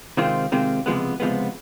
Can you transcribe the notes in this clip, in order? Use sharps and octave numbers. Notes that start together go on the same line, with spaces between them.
C3 D#3 G#3 C4 F4
C3 D#3 G#3 C4 F4
C#2 C3 F3 G#3 B3
C#2 C3 F3 G#3 B3